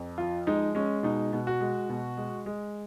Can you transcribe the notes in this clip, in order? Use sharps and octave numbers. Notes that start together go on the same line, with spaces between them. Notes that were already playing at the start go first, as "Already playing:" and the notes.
Already playing: F2
F3 F4
G#3 D#4
G#3 C#4
B2 D#4
B2
F#4
G#3
B2
G#3
G#3